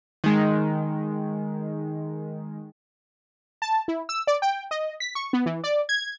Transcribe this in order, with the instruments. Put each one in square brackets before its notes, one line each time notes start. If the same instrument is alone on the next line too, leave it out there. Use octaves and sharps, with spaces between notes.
[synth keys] D#3 G#3
[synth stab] A5
E4
E6
D5
G5
D#5
B6
C#6
B3
E3
D5
G#6